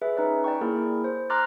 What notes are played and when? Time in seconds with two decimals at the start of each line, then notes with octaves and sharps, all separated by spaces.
0.02 G#4 B4 E5
0.17 C#4 D#4 B4 D5
0.44 D5 G5 C#6
0.61 A#3 E4 G#4 A#4
1.04 C5
1.30 A#5 C6 D6 F6 F#6 A6